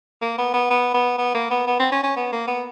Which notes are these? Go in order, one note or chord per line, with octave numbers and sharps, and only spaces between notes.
A#3
B3
B3
B3
B3
B3
A#3
B3
B3
C4
C#4
C#4
B3
A#3
B3